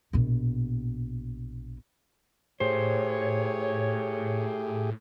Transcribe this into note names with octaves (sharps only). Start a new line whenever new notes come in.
A#1 B2
A2 A3 G4 G#4 C5 C#5